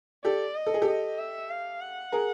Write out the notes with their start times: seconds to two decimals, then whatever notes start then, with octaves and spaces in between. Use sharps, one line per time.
0.25 G4 A4 D5
0.55 D#5
0.66 A4
0.74 G#4
0.82 G4 A4
0.88 D#5
1.18 E5
1.50 F5
1.81 F#5
2.12 G#4 A#4